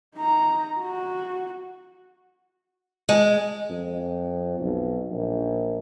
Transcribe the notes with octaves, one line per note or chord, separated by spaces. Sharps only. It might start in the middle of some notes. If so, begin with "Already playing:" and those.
D#4 A#5
F#4
G#3
F2
B1
A#1